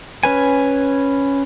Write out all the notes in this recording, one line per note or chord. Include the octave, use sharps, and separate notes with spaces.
C#4 B4 G#5